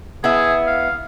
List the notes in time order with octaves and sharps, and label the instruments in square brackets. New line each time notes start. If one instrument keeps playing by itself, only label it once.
[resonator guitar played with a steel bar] B3 E4 E5 [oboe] G#4
[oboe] F5